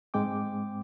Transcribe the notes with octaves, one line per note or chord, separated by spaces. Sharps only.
G#2 G#3 C4 G5 D6